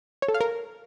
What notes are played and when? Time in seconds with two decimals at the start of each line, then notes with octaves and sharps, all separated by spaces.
0.22 C#5
0.28 A4
0.34 F5
0.41 A#4